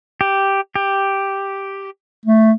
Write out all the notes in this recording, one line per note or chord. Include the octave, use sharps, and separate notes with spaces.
G4
G4
A3